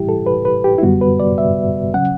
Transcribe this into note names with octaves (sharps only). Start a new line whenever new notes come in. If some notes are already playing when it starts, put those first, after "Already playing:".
Already playing: A2 E3 G3 E4 G4
A4
B4
B4
G4
E4
F#2 D3 G3 B3 F#4
B4
D5
E5
C#3 F#3 C#4 F#5